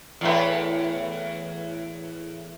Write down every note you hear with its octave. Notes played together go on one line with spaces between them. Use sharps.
E2 A2 B4